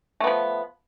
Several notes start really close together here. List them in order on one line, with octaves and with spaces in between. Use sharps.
A3 B3 F3